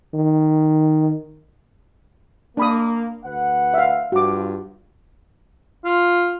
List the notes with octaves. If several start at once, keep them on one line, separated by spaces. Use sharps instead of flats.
D#3
A#3 D4 B5 D#6
D2 B4 F#5
E5 F5
G2 F3 F#4 D6
F4